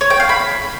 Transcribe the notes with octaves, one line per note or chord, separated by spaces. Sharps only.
C#5
G5
F5
B5